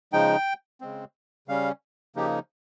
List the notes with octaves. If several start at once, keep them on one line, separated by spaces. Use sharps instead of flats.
C#3 F3 G#3 D#4 G5
C#3 G#3 C4
C#3 G3 C#4 F5
C#3 F3 A#3 D#4 G4